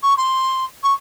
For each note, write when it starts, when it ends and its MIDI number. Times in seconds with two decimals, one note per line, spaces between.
0.03 0.14 85
0.17 0.65 84
0.83 0.94 85